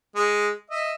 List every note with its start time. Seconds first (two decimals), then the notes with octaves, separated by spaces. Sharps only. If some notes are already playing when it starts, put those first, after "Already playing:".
0.15 G#3
0.70 D#5 E5